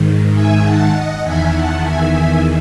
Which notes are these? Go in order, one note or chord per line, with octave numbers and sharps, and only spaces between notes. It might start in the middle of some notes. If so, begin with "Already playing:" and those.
Already playing: G#2 D#3
E5 G#5
F#5 A5
D#5 F#5
E2 D#3 E5 G#5
F#5 A5
E5 G#5
E5 G#5